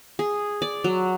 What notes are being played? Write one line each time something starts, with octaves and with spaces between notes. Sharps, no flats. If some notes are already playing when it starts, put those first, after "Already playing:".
G#4
D5
F#3